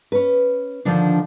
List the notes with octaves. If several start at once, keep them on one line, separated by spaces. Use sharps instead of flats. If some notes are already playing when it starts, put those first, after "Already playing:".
C#4 B4
D3 D#3 F3 D4